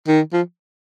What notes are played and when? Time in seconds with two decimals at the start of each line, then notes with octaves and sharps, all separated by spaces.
0.07 D#3
0.33 F3